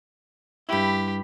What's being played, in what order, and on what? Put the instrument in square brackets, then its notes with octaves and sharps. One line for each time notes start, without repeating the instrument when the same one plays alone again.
[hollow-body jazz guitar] G2 E4 [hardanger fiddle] G4 B5